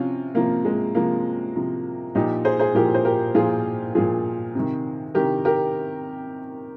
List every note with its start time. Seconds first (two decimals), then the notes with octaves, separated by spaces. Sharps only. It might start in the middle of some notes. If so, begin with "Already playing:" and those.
Already playing: C3 F3 C#4 F4
0.34 C3 F3 A#3
0.65 G#3
0.95 C3 F3 A#3
1.56 C3 F3
2.15 A#2 F3 D#4 G4
2.45 G#4 C5
2.59 G#4 C5
2.75 A#2 F3 G4 A#4
2.94 C5
3.05 G4 A#4
3.35 A#2 F3 F4 G#4
3.95 A#2 F3 F4 G#4
4.55 C3 D#3
5.15 C3 D#3 G4 A#4
5.45 G4 A#4